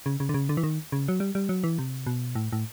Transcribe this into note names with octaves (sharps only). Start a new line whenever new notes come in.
C#3
C#3
D3
C#3
D3
E3
D#3
C#3
F#3
G3
G3
F#3
E3
C3
B2
A2
A2